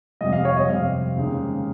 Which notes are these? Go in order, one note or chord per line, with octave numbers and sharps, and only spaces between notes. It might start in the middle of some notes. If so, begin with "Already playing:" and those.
F2 C3 G3 C4 D#5
F5
C#5
D#5
F2 C3 G3 C4 F5
D#2 C#3 G#3 D#4